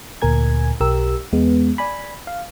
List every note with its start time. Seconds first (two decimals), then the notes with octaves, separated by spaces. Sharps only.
0.22 D2 A#2 A#4 G#5 G#6
0.80 B1 G4 A#4 E6
1.33 E2 G#3 B3
1.78 D5 G#5 B5
2.27 F5